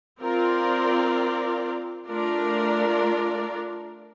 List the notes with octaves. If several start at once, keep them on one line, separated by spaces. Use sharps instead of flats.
C4 F4 A#4 D5
A3 D4 F4 A#4 D5